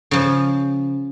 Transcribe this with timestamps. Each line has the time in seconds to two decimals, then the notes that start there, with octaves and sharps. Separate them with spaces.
0.11 C#3 F3